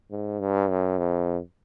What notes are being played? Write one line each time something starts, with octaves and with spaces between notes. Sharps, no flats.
G#2
G2
F#2
F2